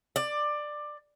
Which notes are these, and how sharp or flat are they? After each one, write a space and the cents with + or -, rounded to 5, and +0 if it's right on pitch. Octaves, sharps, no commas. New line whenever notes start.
D5 +15